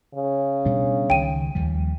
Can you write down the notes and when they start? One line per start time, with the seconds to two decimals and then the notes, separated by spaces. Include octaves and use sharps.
0.15 C#3
0.65 B2 G3 D4
1.10 C#2 D#3 G5 D#7
1.55 D#2 F3 G3